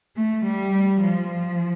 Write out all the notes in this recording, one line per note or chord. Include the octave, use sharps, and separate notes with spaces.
A3
G3
F3
F3